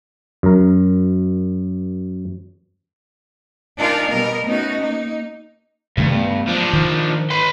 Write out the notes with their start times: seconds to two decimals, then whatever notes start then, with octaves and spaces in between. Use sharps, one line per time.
0.43 F#2 A#4
3.77 D4 D#4 F4 G#4 A#4 D5
4.09 B2 G3 A#4 D#5
4.45 A3 B3 C#4 D#4 F#4 D#5
4.80 A#3 D#4
5.97 G2 C3 D#3 A3
6.13 A3 B3
6.47 F3 D4
6.73 D#3
7.30 B4 C6